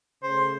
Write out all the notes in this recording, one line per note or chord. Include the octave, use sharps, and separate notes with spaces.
C#3 A3 C5